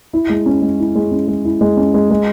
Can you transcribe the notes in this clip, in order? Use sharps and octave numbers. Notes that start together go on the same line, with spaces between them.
E4
G#3
C#4
G#3
E4
G#3
C#4
G#3
E4
G#3
C#4
G#3
G#3